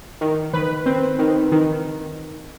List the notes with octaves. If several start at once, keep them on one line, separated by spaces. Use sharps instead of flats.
D#3
D#3 B4
C4
D#3
D#3